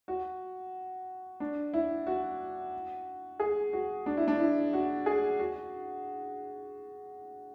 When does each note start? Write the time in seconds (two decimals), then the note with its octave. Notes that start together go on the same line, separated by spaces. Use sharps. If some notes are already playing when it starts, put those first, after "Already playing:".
0.08 F#4
1.40 D4
1.74 E4
2.07 F#4
3.40 G#4
3.73 F#4
4.06 D4
4.17 E4
4.28 D4
4.40 E4
4.73 F#4
5.06 G#4
5.39 F#4